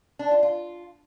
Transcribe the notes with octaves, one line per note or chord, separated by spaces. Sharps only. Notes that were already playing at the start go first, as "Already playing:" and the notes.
D4
F4
F4